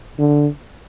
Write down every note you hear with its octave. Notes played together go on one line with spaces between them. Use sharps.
D3